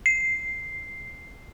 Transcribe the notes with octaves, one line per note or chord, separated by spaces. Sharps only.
C7